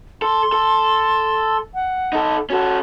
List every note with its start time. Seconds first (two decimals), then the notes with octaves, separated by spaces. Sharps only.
0.22 A4 C6
0.52 A4
1.74 F#5
2.13 D#4 A4
2.50 C#4 F#4 A4